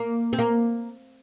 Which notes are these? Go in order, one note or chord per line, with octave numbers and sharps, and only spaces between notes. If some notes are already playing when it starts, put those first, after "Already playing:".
Already playing: A#3
C4
A#3